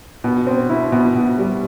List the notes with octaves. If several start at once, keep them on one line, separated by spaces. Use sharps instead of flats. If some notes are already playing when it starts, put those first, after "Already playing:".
B2
C4
E4
B2
B2
G3